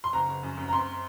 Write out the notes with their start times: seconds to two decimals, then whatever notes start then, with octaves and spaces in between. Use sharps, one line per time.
0.04 C6
0.13 F#1 A#5
0.28 F#1
0.43 F#2
0.57 F#2
0.68 A#5
0.73 C4 C6